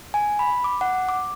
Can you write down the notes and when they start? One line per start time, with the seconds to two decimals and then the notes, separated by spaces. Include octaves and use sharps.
0.14 G#5
0.39 B5
0.64 D6
0.81 F#5
1.09 D6